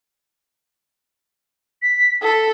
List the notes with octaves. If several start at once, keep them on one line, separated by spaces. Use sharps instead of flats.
B6
A4 B6